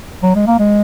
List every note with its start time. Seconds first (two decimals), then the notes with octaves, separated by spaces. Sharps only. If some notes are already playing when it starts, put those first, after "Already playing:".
0.23 F#3
0.36 G#3
0.47 A#3
0.59 G#3